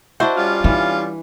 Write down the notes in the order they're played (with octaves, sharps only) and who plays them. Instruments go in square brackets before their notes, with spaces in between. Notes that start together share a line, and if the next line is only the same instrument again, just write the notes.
[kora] D4 D#5 [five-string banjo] E4 F#4 C5
[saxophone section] G3 C#4 F4
[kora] E3 [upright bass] D#4